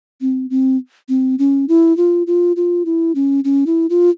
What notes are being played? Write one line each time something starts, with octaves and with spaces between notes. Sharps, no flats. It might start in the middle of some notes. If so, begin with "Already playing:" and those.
C4
C4
C4
C#4
E4
F4
F4
F4
E4
C#4
C#4
E4
F4